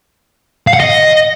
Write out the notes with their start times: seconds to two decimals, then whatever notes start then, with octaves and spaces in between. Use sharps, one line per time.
0.67 F5
0.74 F#5
0.80 D#5